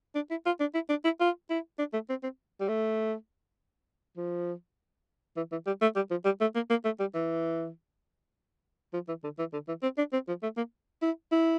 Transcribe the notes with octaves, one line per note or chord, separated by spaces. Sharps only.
D4
E4
F4
D4
E4
D4
E4
F4
E4
D4
A3
C4
C4
G3
A3
F3
E3
E3
G3
A3
G3
F3
G3
A3
A#3
A#3
A3
G3
E3
F3
E3
D3
E3
D3
E3
C4
D4
C4
F3
A3
A#3
E4
E4